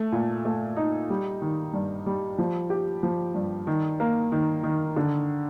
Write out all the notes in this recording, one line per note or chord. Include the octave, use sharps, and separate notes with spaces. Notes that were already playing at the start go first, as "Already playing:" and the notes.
Already playing: A3
A#2
A3
D#4
G3
D#3
G2
G3
F3
G4
F3
G2
D#3
A#3
D#3
D#3
D3